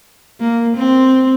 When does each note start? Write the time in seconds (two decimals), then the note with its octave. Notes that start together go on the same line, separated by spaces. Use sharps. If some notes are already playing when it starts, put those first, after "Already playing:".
0.41 A#3
0.77 C4